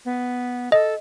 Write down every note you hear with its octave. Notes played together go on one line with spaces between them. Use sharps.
B3
A4 D#5